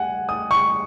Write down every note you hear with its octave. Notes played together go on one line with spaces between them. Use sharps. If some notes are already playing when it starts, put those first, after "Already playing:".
Already playing: F#5 G#5
D#6
C#6